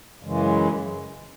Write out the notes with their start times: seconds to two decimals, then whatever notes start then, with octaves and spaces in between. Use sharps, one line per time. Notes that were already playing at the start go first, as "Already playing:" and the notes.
0.23 F#2 C#3 E3 G#3